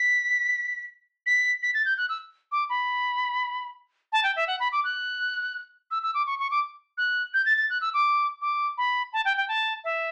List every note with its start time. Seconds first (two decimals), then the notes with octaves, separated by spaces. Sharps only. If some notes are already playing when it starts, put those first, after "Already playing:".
Already playing: B6
1.26 B6
1.62 B6
1.74 A6
1.85 G6
1.98 F#6
2.09 E6
2.52 D6
2.69 B5
4.13 A5
4.24 G5
4.36 E5
4.47 F#5
4.60 B5
4.72 D6
4.84 F#6
5.91 E6
6.03 E6
6.14 D6
6.27 C#6
6.39 C#6
6.51 D6
6.98 F#6
7.34 G6
7.46 A6
7.57 A6
7.70 F#6
7.81 E6
7.94 D6
8.42 D6
8.78 B5
9.13 A5
9.25 G5
9.37 G5
9.48 A5
9.84 E5